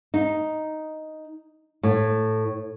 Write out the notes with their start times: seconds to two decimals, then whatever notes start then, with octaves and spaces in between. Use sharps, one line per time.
0.14 D#4
1.83 A2